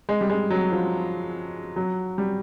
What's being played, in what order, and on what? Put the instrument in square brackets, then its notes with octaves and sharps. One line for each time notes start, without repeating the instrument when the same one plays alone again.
[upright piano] G#3
G3
G#3
F#3
F3
F#3
G3